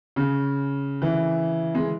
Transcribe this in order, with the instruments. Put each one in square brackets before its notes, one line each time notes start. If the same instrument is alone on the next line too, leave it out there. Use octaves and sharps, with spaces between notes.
[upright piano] C#3
E3
G#3